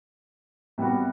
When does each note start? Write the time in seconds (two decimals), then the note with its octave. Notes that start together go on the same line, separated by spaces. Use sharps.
0.78 C3 G3 B3 F#4